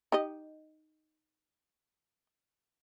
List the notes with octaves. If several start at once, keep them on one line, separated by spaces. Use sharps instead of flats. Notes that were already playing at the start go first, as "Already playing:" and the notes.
D#4 G4 D#5